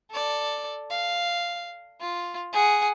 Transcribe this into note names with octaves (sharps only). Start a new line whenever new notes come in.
A4 D5
F5
F4
G#4 F#5